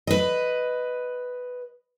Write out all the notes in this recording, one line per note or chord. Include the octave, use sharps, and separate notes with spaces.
B4 D#5